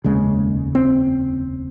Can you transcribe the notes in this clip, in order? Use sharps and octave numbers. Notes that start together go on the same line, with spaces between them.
F1 D#2 C#3 G#3
C4